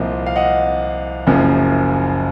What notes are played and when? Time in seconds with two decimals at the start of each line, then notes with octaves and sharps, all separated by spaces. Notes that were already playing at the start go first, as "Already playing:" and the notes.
Already playing: C2 A#2 F3 D#5
0.26 F5
0.36 D#5 F#5
1.27 F#1 F#2 C#3 F3